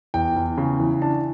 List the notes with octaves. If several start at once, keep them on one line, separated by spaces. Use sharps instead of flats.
E2 G5
E2
C#3
E3
D4 A5